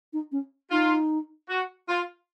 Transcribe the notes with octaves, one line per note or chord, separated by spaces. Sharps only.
D#4
C#4
D#4 F4
F#4
F4